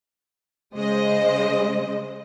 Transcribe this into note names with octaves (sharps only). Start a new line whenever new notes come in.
C#3 G#3 C5 D#5